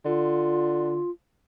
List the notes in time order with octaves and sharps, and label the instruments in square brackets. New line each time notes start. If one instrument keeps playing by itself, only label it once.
[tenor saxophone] D3 [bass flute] F4